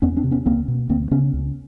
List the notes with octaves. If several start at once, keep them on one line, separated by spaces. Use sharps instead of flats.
E2 B3 C#4
C4 D4
C3
B3 C#4
C#2 A#3 C4
B2
D2 A#3 C4
C#3 B3 C#4
C#2